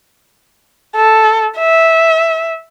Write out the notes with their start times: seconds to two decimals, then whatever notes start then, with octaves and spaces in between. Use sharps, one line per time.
0.96 A4
1.58 E5